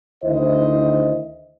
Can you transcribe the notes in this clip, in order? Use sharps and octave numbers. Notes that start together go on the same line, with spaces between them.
D2 D#3 E4 C5 D#5